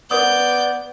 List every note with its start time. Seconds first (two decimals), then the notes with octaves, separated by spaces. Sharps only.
0.11 B3 B4 D5 D#6 G6